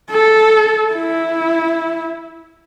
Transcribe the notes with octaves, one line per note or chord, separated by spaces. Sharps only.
A4
E4